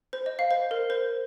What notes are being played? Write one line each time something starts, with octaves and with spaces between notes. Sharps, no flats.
C5
D#5
F5
C5
A#4
C5